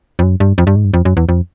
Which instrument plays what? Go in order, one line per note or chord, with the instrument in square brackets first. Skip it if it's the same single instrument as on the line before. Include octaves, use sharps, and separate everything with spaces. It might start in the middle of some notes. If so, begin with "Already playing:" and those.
[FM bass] F2
F#2
G2
F2
G2
G#2
G2
F2
F#2
E2
F2